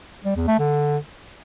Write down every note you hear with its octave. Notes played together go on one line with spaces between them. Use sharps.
G3
E2
A3
D3